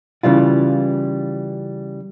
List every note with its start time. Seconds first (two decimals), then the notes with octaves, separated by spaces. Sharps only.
0.23 C#3 E3 G3 F4